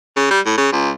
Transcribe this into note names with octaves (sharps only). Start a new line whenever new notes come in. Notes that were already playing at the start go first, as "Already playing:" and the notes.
C#3
G3
A2
C#3
C#2